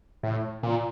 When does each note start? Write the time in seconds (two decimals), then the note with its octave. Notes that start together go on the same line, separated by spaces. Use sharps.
0.23 A2
0.63 A#2